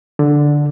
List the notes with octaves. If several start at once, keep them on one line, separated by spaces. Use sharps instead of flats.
D3